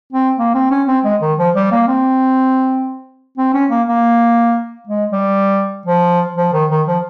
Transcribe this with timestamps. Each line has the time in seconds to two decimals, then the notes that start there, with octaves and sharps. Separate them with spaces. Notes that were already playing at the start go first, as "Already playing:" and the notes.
0.13 C4
0.38 A#3
0.54 C4
0.71 C#4
0.87 C4
1.04 G#3
1.21 D#3
1.38 F3
1.55 G3
1.71 A#3
1.88 C4
3.37 C4
3.54 C#4
3.71 A#3
3.88 A#3
4.87 G#3
5.12 G3
5.86 F3
6.37 F3
6.53 D#3
6.70 D#3
6.87 F3